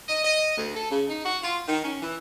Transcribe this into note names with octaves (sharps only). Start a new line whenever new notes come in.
D#5
D#5
D2
A4
C#3
D#4
F#4
F4
D#3
C#4
E3